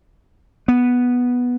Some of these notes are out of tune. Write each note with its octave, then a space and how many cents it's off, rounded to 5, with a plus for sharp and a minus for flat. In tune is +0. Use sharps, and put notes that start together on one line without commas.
B3 -5